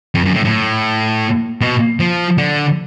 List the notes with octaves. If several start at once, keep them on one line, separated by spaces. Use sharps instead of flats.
F2
F#2
A2
A2
B2
F3
D3